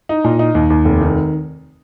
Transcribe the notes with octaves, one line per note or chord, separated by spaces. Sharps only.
D#4
A#2
D#4
D#2
D#2
F1
D#3